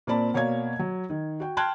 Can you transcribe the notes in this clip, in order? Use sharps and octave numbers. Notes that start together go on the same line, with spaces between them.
A#2 A#3 C4 D5 A5 B5
B2 A#3 C#5 D5 F5 G#6
F#3
D#3
F#4 G5
G5 A5 C6 F6 F#6 G#6